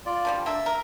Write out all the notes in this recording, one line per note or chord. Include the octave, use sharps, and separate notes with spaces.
F4 D5
D3 F3 G3
A#3 D4 A4 E5
A#4